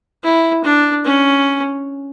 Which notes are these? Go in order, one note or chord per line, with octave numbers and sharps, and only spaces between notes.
E4
D4
C#4